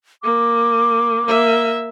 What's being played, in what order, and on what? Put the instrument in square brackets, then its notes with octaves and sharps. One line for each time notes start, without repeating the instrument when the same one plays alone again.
[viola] A#3 [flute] D6
[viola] A#3 E5